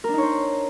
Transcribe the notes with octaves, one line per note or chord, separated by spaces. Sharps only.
D4 D#4 A#4 C5 C#5